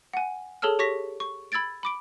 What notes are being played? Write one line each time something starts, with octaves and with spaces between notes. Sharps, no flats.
F#5 G#5
G#4 A4 C#5 A5 E6 F6
G4 C#5 C#6 A#6 B6
C#6
B5 E6 G#6 A6 D7
B5 D6 D7